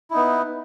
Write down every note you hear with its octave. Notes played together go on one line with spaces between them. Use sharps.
B3 D#4 E4